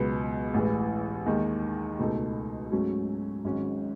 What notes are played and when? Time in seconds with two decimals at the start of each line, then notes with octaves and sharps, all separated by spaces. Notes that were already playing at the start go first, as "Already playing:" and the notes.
Already playing: C#2 B2 F#3 B3
0.54 A1 A2 E3 G#3
1.26 D#2 D#3 G#3
1.99 C#2 B2 A3 D#4 A4
2.72 G#2 F#3 A3 C#4 G#4
3.44 G#1 G#2 F#3 C#4